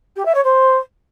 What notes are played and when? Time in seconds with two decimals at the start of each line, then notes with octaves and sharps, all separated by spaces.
0.16 G4
0.25 E5
0.35 C#5
0.44 C5